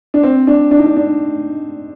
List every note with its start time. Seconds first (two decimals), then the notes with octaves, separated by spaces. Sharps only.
0.14 D4
0.23 C4
0.47 D4
0.71 D4
0.79 D#4
0.86 D4
0.96 D4